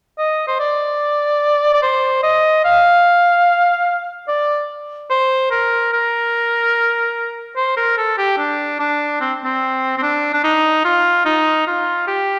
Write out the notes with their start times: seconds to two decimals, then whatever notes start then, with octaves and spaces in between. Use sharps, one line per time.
0.18 D#5
0.48 C5
0.59 D5
1.74 D5
1.82 C5
2.23 D#5
2.64 F5
4.28 D5
5.10 C5
5.51 A#4
5.93 A#4
7.56 C5
7.77 A#4
7.97 A4
8.18 G4
8.38 D4
8.79 D4
9.21 C4
9.44 C4
9.97 C4
10.02 D4
10.33 D4
10.43 D#4
10.84 F4
11.25 D#4
11.67 F4
12.07 G4